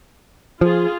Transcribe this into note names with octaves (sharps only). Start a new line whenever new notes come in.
F3 F4 G#4